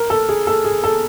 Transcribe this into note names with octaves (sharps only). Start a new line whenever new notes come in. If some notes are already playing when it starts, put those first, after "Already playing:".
Already playing: A#4
A4
G#4
A4
G#4
A4